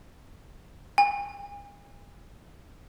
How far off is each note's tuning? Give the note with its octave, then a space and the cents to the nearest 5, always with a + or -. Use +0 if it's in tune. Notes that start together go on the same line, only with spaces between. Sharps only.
G#5 -45